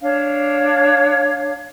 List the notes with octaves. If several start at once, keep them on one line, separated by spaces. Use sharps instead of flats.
D4 C#5 F5